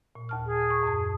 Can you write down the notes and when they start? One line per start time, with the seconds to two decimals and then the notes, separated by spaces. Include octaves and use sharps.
0.15 A#2
0.29 D#2 A5 F6
0.46 G#4
0.70 C#6
0.83 F#2 A5